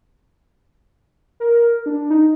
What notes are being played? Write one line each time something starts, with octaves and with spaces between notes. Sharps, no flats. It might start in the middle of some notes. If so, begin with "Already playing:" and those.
A#4
D4
D#4